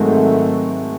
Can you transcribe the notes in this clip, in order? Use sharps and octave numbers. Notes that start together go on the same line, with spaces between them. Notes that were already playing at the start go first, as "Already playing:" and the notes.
Already playing: G#2 D#3 F#3 G#3 A3 C4 F#4